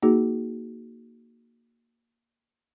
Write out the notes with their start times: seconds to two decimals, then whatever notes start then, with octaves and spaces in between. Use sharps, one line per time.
0.03 A#3 D#4 F#4 G#4